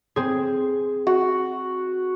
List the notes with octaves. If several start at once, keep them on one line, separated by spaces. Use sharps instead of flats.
C4 G#4
F#4